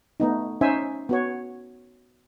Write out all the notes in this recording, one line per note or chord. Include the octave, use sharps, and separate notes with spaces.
A3 B3 D#4
C#4 D#4 C5 E5 G#5
B3 F#4 C#5